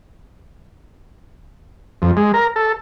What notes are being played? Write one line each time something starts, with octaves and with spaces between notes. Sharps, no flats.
F2
G#3
A#4
A4